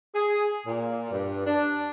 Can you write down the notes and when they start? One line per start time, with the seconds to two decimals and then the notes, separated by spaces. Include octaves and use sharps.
0.15 G#4
0.67 A#2
1.11 G2
1.47 D4